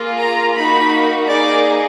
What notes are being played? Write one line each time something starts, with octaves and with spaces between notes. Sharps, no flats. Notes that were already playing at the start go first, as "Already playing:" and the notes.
Already playing: A#3 F4 G#4
A#5
A#3 D#4 F#4 B5
A#3 D#4 G#4 D5